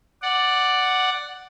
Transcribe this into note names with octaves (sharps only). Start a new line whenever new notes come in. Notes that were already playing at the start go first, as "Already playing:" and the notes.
D5 F#5